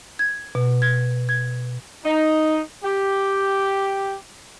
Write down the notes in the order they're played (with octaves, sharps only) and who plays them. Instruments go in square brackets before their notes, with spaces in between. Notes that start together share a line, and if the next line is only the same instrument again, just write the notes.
[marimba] G#6
B2
G#6
G#6
[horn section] D#4
G4